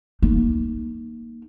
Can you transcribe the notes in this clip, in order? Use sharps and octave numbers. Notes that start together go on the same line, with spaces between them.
A#3 D#4